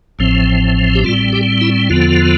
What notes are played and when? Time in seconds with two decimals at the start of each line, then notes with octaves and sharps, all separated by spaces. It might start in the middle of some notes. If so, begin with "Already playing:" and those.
0.19 A1 A2 F3 C4
0.95 G4
1.04 A2 G3 C4 F4
1.33 G4
1.61 E4
1.90 E2 D3 F3 B3 F4